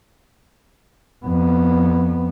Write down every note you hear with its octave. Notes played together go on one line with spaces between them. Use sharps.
F2 B3